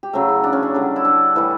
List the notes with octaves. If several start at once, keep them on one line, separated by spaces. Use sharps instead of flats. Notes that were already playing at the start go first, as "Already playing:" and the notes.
G4
C#3 F#3 A3 F#4
E4
D4
C#4
D4
D3 G3
E4
D4
A2 E3 G3